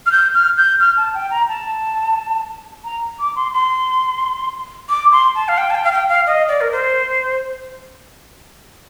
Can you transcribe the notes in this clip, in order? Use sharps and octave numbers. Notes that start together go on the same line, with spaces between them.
F6
G6
F6
G6
F6
A5
G5
A#5
A5
A#5
D6
C6
C6
D6
C6
A5
F5
G5
A5
G5
F5
G5
F5
D#5
D5
A#4
C5